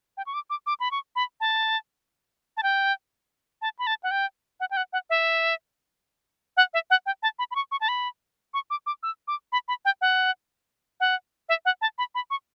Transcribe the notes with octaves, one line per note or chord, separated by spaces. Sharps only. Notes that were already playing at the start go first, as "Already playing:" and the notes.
G5
C#6
D6
D6
D6
B5
C#6
B5
A5
A5
G5
A5
B5
A5
F#5
G5
F#5
G5
F#5
F#5
E5
F#5
E5
F#5
G5
A5
B5
B5
C#6
C#6
A5
B5
C#6
D6
D6
E6
D6
B5
B5
G5
F#5
F#5
E5
F#5
A5
B5
B5
C#6